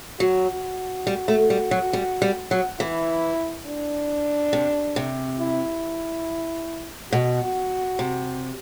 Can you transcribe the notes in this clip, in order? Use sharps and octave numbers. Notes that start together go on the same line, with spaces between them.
F#3 F#4
G3
A3
G3
F#3
G3
G3
F#3
E3 E4
D4
C3
C3
E4
B2 F#4
C3